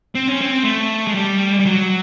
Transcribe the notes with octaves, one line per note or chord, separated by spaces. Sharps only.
C4
C#4
C4
A3
G#3
G3
G3
F#3